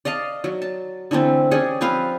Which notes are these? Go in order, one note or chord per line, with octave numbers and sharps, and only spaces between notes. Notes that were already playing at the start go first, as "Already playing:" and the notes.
D5 D#5 F5 A5
F#3
A5
D3 E3 A3 C4
C#4 G4 G#4 D5
F3 C4 B4 F5